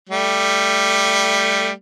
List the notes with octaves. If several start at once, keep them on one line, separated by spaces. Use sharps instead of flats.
G3 A3